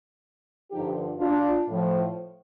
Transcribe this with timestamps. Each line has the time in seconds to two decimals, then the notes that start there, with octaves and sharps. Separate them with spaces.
0.71 G2 D3 F3 D#4 G4
1.19 D4 F4
1.68 A2 F3